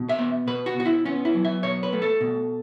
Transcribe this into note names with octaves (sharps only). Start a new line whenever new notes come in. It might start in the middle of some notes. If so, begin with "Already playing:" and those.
Already playing: B2
E5
B3
B2 B4
F#4
B2 F#4
E4
B3 C#4
E4
F#3
E5
B2 C#5
B4
A3
A4
B2